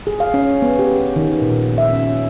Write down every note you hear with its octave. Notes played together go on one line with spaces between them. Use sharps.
G#4
F5
C#4
B3
G4
D#3
A#2
E5
C#4